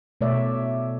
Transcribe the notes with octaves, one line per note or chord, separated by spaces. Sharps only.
B2 A3 C#5 D5 E5